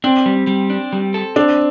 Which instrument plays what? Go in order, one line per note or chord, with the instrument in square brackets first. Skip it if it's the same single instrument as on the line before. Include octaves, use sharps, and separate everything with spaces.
[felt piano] C4 [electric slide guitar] D4
[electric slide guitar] G3
G3
D4
G3
A4
[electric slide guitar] C4 [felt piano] D4